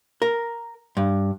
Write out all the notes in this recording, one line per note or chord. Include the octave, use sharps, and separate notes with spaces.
A#4
G2